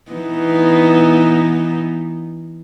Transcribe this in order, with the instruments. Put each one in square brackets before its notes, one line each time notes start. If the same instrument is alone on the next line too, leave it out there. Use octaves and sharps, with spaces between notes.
[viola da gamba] E3 B3 D#4